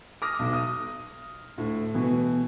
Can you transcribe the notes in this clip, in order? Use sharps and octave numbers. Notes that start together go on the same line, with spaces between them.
D6 D#6 F6 A#6
B1
D#6
D2 A2
B2 E3